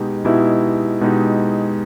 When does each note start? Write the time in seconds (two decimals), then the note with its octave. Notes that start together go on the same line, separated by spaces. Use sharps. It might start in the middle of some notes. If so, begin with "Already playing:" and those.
Already playing: B2 G#3 D#4 G4
0.25 B2 G#3 D#4 E4 G4
1.01 B2 G#3 D#4 G4